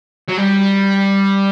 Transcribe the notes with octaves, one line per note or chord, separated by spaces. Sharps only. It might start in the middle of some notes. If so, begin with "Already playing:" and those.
F#3
G3